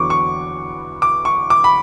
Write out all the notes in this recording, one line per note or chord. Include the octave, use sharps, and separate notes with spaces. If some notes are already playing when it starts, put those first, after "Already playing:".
Already playing: E2 D3 F#3 B3 C#6 D6
C#6
D6
C#6
D6
B5